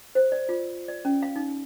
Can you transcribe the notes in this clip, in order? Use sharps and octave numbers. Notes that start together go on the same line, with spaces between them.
C5
D5
F4
D5
C#4
F5
D#4